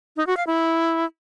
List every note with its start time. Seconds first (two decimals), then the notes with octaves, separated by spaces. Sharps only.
0.17 D#4
0.27 F#4
0.37 F5
0.47 E4